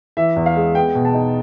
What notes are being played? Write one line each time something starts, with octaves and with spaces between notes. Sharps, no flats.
E3 E5
E2
F5
G#3
B3 G5
B2
A5
D#4